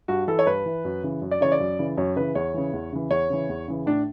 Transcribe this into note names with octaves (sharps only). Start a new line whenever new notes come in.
G2 F#4
E3 A4
C#5
G2 B4
E3
F#2
C#3 E3
F#2
D5
C#3 E3 C#5
D5
F#2
C#3 E3
F#2 C#5
C#3 E3 B4
E2 C#5
C#3 E3
E2
C#3 E3
E2 C#5
C#3 E3
E2
C#3 E3
A2 D4